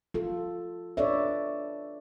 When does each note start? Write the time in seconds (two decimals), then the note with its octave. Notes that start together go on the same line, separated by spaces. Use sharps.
0.14 F4 A4
0.97 D4 A4 B4 C#5 D5 E5